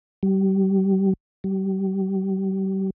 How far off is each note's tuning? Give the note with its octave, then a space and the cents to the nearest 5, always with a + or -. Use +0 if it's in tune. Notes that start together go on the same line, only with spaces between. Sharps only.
G3 -30
G3 -35